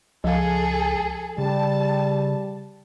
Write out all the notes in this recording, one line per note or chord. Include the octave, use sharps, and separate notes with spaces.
C#2 F3 G#4 A4 F5
C#3 G3 A5